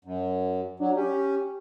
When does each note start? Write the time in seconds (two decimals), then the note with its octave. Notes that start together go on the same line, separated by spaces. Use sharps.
0.05 F#2
0.80 F#3 D4
0.96 C#4 G4